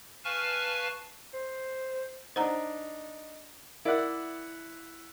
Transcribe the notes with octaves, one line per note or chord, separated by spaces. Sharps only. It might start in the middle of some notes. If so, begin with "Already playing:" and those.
B4 F5 G#5 A5 C#6 F6
C5
D4 D#4 C5 F#5 A#5
E4 A#4 D5 E5 F#5